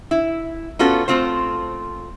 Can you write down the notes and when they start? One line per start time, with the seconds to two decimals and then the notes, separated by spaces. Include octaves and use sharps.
0.11 E4
0.79 B3 C#4 F4 F#4 A4
1.08 A3 C4 F4 C5